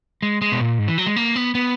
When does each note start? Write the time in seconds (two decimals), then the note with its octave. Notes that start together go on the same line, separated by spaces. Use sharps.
0.22 G#3
0.42 G#3
0.52 B2
0.61 A#2
0.79 G#2
0.88 E3
0.98 F#3
1.07 G#3
1.16 A#3
1.36 B3
1.55 B3